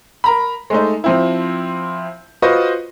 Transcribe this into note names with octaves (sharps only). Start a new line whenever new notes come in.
A#4 A#5 B5
G#3 A3 D#4
F3 C4 E4
F4 F#4 B4 C5 D#5